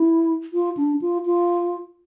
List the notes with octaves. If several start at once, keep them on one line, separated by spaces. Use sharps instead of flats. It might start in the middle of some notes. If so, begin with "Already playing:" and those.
Already playing: E4
F4
D4
F4
F4